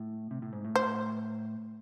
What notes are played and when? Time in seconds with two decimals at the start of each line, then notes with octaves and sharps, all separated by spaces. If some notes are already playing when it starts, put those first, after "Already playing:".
Already playing: A2
0.31 C3
0.42 A2
0.53 G#2
0.64 A2
0.76 C5